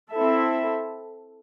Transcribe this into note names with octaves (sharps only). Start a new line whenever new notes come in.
C4 E4 A4 E5